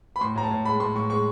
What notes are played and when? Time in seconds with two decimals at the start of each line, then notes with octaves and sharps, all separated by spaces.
0.16 B5
0.21 A2 C6
0.36 A2 A#5
0.43 A5
0.51 A2
0.65 G#3 B5
0.80 A2 C6
0.96 A2 C#6
1.10 G#3 C#6